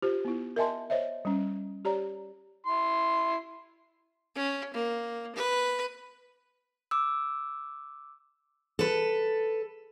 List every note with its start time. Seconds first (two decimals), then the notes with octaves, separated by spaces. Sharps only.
0.02 F4 G4 C5
0.25 B3 E4
0.56 A#4 D#5 E5 G#5 A5 C6
0.90 C5 C#5 D#5 E5
1.25 G3 C#4
1.85 G4 C#5 D5 A#5
2.66 E4 C6
4.35 C#4
4.74 A#3
5.35 B4
6.91 D6 E6
8.79 A4 B4